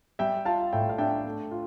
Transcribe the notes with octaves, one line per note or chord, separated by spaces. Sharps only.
G3 E5 G5
F4 F5 A5
A2 E5 G5
F5
D4 E5 G5
A3
F4